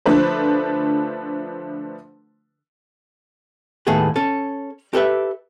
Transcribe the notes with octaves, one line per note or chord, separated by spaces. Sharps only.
D3 F3 A3 D4 B4 C5
D#2 A2 A3 B3 G#4 A4
C#4 A4
G4 A4 B4 E5